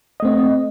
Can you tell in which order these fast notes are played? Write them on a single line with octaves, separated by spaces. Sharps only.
D#5 A3 C4